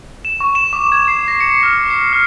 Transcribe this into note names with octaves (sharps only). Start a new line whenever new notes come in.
E7
C#6
E7
D6
G#6
C7
A#6
C#7
F6
C7
F6